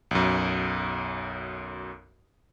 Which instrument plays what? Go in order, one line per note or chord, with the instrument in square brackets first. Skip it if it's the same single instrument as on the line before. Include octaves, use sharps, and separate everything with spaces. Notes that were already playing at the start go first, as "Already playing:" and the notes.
[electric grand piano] B1 F#2